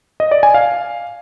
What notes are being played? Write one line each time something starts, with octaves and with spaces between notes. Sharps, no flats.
D#5
D5
G#5
F5